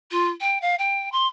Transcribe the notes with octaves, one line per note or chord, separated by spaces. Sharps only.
F4
G5
F5
G5
C6